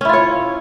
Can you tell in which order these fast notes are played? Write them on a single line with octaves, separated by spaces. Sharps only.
C#4 E4 F4 C#5